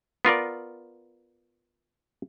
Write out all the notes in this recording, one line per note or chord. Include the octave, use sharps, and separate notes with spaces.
B3 F4 A#4 D5